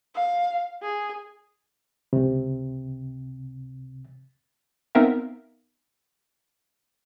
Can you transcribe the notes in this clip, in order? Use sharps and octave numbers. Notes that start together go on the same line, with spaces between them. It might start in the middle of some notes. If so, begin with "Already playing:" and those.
F5
G#4
C#2 C3
B3 C4 D#4 A#4 E5 F5